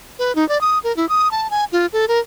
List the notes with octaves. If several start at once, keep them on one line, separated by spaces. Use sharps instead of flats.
B4
D#4
D5
D#6
A#4
E4
D#6
A5
G#5
F4
A4
A#4